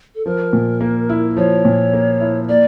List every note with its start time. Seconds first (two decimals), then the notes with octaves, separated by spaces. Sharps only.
0.15 A4
0.25 F3 A#4
0.53 A#2
0.81 A#3
1.10 E4
1.37 F3 C#5
1.65 A#2
1.93 A#3
2.21 E4
2.49 A#3 D5